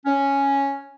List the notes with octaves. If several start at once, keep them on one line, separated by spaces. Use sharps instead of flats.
C#4